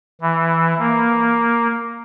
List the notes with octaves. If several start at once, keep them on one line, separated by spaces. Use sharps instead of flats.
E3
A#3